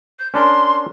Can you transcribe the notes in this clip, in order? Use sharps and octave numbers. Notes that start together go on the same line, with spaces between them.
G6
C#4 D4 A#4 C6